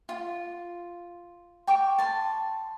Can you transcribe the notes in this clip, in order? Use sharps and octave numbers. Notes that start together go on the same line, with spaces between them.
F4
G5 C#6 D6
A5 C6